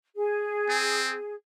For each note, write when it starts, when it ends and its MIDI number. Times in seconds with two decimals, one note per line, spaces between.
0.16 1.33 68
0.69 1.15 60